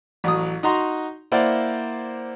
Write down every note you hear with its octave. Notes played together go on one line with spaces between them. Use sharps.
A1 F#3 D#6
D#4 F#4 A#5 C6
A#3 E4 A#4 C5 D5 F#5